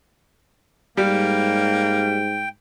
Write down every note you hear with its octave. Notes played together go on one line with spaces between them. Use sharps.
G#2 G3 A#3 G5